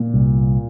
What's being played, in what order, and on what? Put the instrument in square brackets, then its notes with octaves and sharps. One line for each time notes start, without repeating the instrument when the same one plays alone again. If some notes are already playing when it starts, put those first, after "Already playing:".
Already playing: [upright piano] A#2
[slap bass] C2